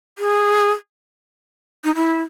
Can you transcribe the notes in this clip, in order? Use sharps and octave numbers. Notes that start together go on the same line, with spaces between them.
G#4
D#4
E4